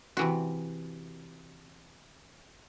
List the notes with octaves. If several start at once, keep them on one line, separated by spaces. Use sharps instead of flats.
C3 E3 F#4